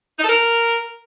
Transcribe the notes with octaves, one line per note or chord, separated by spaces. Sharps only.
D#4
A4
A#4